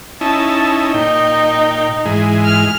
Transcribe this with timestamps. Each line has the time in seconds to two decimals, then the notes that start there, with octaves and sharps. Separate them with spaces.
0.21 C#4 D#4 E4 A5
0.94 A#2 D#4 G5
2.05 G#2 E3 G#3
2.45 F6